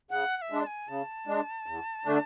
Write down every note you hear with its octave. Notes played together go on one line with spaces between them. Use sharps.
C#3 F#5
F#5
E5
G#3 D4
A5
G#5
C#3 A5
G#3 D4
E2
D3 A3 D4